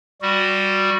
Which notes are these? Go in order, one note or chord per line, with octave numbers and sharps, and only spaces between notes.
G3 F#4